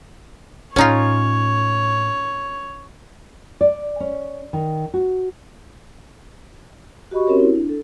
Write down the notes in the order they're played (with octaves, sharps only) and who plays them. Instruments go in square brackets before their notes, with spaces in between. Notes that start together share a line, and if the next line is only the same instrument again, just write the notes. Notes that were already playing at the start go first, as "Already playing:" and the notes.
[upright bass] A2 [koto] C#4 D#4 F4 [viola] C#5
[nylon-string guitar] D5
C#4
D#3
F#4
[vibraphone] F#4 G4 D#5 B5 C#6
C4 C#4 F#4 G4 A#4 C#5
E4
D4
A4